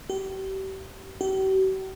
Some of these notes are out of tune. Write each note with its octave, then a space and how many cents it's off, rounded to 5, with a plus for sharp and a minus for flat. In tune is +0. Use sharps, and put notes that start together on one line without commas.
G4 -35
G4 -45